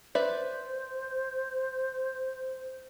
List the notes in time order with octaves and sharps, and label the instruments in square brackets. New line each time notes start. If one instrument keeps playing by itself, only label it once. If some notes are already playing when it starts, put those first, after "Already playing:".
[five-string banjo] B4 D5 E5 [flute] C5